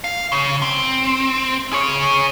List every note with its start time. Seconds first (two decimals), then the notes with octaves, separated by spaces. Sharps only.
0.04 F5
0.32 C#3
0.62 C4
1.73 G#4 C#5